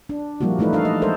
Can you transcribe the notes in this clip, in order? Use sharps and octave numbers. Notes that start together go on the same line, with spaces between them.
D4
F3 G3 A#3 E4 F#4
E3 A3 D#4 E4 B4
D4 E4 A4 F5
D#5
G#3 A4 A#4 C5